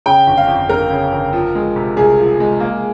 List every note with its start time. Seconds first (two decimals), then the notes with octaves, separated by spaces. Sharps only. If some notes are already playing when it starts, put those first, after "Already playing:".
0.06 C#3 G5
0.27 G1
0.37 F5
0.48 F2
0.69 G1 A#4
0.90 C#3
1.12 G1
1.33 F3
1.55 G#3
1.76 C3
1.97 C2 G#4
2.19 F3
2.40 G#3
2.60 A#3